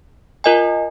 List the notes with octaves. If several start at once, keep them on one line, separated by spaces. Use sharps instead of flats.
F4 A#4 D#5 G#5